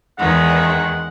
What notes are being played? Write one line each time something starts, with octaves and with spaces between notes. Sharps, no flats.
E2 D#3 G#3 F#5